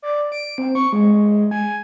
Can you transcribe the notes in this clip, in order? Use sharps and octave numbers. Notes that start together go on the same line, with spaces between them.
D5
D7
C4
C#6
G#3
G#5